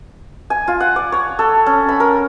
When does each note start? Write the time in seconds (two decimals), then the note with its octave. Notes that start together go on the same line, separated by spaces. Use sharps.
0.50 G#5
0.68 F4
0.80 F#5
0.96 D5
1.12 C#5
1.39 A4
1.66 C#4
1.89 B5
2.00 A#4